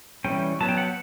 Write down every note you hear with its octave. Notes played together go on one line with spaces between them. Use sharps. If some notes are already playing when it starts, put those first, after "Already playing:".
E3 G3 C#4 G5
F#3 B3 A5
G5
F#5